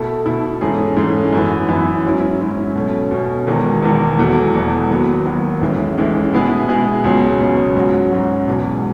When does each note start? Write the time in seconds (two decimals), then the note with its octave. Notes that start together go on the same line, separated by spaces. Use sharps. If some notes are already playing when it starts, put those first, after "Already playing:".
Already playing: B2 A3 E4 A4
0.26 B2 A3 E4 A4
0.61 G#2 E3 A3 C#4 G#4
0.96 G#2 E3 A3 C#4 G#4
1.33 F#2 E3 B3
1.68 F#2 E3 B3
2.04 G#2 F#3 C#4 E4
2.40 G#2 F#3 C#4 E4
2.75 B2 A3 C#4
3.11 B2 A3 C#4
3.47 E1 E2 D#3 G#3
3.83 E1 E2 D#3 G#3
4.18 E1 E2 B2 F#3 A3
4.54 E1 E2 B2 F#3 A3
4.90 D#2 D#3 F#3 B3
5.25 D#2 D#3 F#3 B3
5.61 A1 A2 E3 G#3 C#4
5.97 A1 A2 E3 G#3 C#4
6.33 B2 G#3 B3 E4 G#4
6.68 B2 G#3 B3 E4 G#4
7.04 C#2 B2 F#3 C#4 G#4
7.40 C#2 B2 F#3 C#4 G#4
7.75 G#2 F#3 C#4 F#4
8.11 G#2 F#3 C#4 F#4
8.47 E1 E2 B2 G#3